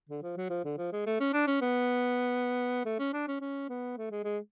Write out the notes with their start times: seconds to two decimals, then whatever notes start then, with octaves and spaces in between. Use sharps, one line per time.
0.09 D3
0.23 F3
0.37 F#3
0.50 F3
0.64 D3
0.78 F3
0.92 G#3
1.06 A3
1.20 C#4
1.33 D4
1.47 C#4
1.61 B3
2.85 A3
2.99 C#4
3.13 D4
3.28 C#4
3.41 C#4
3.69 B3
3.97 A3
4.11 G#3
4.24 G#3